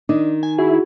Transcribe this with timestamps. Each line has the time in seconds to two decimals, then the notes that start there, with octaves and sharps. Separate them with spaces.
0.09 D#3 D4 D#4
0.43 G#5
0.59 E4 F#4 G#4